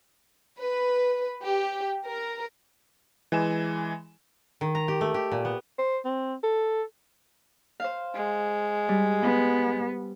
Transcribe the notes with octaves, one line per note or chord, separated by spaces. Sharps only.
B4
G4
A#4
E3 G#3 G#5 E7
D#3
A#5
G4
A3
G4
A#2
B3
C5
C4
A4
C5 F5
G#3
G3
B3